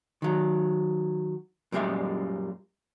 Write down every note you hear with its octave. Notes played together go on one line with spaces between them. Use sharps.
D#3 F#3
F#2 A#2 G3 G#3 E5